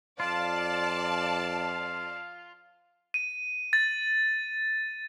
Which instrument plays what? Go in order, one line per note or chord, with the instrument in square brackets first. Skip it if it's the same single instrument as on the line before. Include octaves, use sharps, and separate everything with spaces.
[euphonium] F2 [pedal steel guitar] F4 [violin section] D5 A5 [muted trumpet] F5
[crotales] D#7
A6